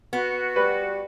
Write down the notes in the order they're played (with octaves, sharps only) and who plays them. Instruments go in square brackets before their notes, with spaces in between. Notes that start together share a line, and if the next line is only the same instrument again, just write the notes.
[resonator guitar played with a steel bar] B3 [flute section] F#4
[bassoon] G3 [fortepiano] B4